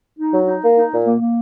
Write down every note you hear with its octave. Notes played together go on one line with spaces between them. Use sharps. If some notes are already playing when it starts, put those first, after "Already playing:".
D#4
F#3
D#4
A#3
D#4
A#2
A#3
A#3